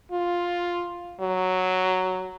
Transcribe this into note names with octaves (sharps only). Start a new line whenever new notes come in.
F4
F#3